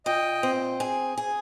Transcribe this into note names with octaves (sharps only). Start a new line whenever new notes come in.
A#2 D#5 G5
C4
G#4
G#4